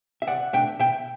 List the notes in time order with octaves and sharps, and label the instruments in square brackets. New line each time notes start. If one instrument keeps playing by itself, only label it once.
[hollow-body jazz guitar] E5
C2 D5 F#5
B2 A3 D4 E5 G5
B2 E5 G5